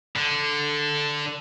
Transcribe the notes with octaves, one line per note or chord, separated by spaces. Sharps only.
D3